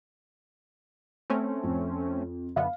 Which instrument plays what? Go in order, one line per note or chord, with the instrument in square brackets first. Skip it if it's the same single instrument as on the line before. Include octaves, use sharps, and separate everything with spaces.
[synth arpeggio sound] A3 C4 C#4
[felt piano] F2
[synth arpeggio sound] F#2 D3 B3 [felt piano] F5